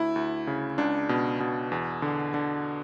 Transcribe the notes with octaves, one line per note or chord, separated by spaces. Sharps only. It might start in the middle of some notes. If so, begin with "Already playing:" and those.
Already playing: D2 E4
D2
C#3
C#2 D4
B2
B2
E2
D3
D3